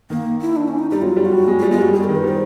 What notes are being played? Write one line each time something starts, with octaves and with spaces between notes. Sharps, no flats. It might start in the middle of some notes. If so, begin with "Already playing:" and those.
D#3 A#3
E4
D4
C#4
D#4
G3 D#4
F#3 F4
G3
F#4
G3
G#3
F4
G3
G#3 F4
G3 F#4
G3 G#4
D#3 A#4
B4
G3 C5